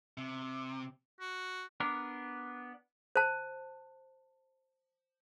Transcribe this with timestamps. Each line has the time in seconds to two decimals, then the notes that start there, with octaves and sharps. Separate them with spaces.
0.17 C3
1.20 F#4
1.80 B3 D4 A#4
3.16 C5 A5